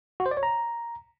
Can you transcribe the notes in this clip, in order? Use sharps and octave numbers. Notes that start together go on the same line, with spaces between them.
F#4
C5
D5
C#5
A#5